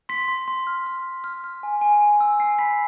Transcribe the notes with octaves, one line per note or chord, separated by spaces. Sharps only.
C6 B6
C6
C6
F6
F6
C6
F6
F6
G#5
G#5
G#5
E6
G#5 C7
B5 B6